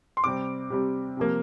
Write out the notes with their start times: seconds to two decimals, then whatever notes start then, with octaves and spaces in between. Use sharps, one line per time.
0.17 C6
0.24 C3 G3 C4 D6
0.70 C3 G3 C4
1.17 C3 F3 A#3